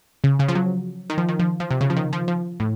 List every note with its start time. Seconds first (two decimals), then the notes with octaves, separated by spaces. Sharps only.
0.24 C#3
0.39 C#3
0.49 F3
0.55 F#3
1.10 D#3
1.18 F3
1.29 D#3
1.39 F3
1.60 F3
1.71 C3
1.81 C#3
1.90 F3
1.97 D#3
2.13 F3
2.28 F3
2.60 A2